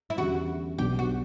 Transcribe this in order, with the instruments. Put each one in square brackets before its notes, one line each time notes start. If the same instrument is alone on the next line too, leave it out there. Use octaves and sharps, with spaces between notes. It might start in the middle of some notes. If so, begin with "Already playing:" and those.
[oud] E4
[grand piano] E2 D3 G3 C#4 [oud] F#4
[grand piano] B1 B2 G3 B3 D4 [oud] G4
[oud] F#4